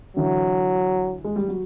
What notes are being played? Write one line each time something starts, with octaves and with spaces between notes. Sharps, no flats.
D3 E3 F#3
G#3
G3
F#3